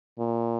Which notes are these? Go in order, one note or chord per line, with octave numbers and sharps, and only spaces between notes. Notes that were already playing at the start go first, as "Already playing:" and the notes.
A#2